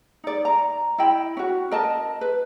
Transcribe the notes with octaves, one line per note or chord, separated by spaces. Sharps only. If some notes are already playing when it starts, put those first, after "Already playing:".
D#4 D5
A#5
E4 D#5 G5 B5
C#4 F#4
A#4 D#5 A5
B4